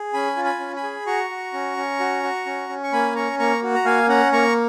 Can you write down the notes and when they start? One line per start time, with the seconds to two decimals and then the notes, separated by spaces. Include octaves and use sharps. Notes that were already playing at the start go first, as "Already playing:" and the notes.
Already playing: G#4
0.13 C#4 G#5 B5
0.37 F4
0.45 G#5 B5
0.60 C#4
0.76 G#5 B5
0.83 G#4
1.07 F#4 A#5 C#6
1.29 F#4
1.54 C#4
1.77 C#4
2.00 F#4
2.23 F#4
2.46 C#4
2.69 C#4
2.83 C#6
2.93 A#3 G#5 B5
3.15 C#4 A#5 C#6
3.39 A#3 A#5 C#6
3.63 F#4
3.75 A#5
3.85 A#3 F5 G#5
4.08 C#4 F#5 A#5
4.32 A#3 A#5 C#6